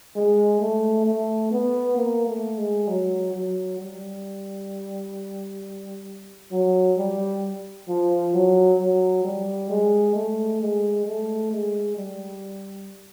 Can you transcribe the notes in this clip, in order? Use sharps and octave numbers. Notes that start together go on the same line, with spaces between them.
G#3
A3
A3
B3
A#3
A3
G#3
F#3
F#3
G3
F#3
G3
F3
F#3
F#3
G3
G#3
A3
G#3
A3
G#3
G3